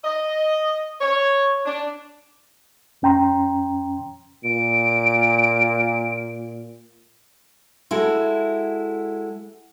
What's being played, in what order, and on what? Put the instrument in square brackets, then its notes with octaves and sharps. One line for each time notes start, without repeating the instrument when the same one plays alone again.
[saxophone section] D#5
C#5
D4
[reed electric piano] F2 C#4 G5 A#5 C6
[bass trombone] A#2 [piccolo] D7
[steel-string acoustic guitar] G#3 E4 F#4 A4